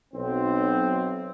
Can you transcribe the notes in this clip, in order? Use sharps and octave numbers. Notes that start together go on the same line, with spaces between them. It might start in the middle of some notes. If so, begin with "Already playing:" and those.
B1 C4